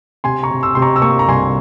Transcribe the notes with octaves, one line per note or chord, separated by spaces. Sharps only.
C3 G#5 C6
A#5 C#6
C3
C6 E6
C3 C6
A#5 C#6
E6
A#3 A#5 C#6
A#5
C2 G#5 C6